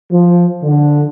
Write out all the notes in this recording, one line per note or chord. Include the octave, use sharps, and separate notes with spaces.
F3
D3